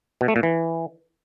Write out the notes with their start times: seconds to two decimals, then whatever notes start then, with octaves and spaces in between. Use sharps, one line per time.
0.21 B2
0.28 A3
0.36 A#2
0.43 E3